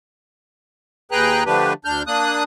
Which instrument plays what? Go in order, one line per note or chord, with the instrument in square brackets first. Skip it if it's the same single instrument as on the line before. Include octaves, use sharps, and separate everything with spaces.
[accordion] D#2 G#4 B4 G5 A#5 F#6
D3 F3 A3 D4 G4 B4
D2 D4 F6 G6
A#3 D4 D#6 F#6